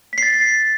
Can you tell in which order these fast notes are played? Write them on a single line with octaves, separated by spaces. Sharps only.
B6 C7 A6